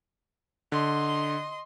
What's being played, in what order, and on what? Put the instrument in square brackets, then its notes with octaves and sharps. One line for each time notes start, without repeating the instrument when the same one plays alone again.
[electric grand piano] D3 [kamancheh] D#5 C6